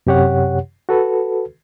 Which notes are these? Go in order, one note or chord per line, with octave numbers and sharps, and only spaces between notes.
F#2 C3 G4 C#5 F#5
F#4 A4 B4